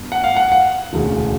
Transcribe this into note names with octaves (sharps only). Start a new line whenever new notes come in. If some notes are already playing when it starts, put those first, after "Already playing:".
Already playing: G2 B3
F#5
F5
F#5
F#5
E1 D2 C#3